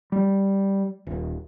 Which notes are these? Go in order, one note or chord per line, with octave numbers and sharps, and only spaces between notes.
G3
D#1